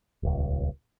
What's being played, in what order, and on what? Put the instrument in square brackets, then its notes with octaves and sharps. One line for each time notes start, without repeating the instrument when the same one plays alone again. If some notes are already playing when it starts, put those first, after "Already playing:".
[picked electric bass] D#1 C#2